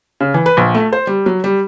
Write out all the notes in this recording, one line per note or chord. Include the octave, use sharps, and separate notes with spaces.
C#3
E3
B4
A#1
A3
C5
G3
F#3
G3